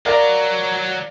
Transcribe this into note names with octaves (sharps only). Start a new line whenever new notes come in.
F#3 A#4 D5 F5 A#5